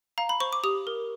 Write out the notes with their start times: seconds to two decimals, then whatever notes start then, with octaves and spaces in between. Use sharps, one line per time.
0.18 F5 A#5
0.29 B5
0.40 C5 C#6
0.53 D6
0.64 G4 D#6
0.87 A#4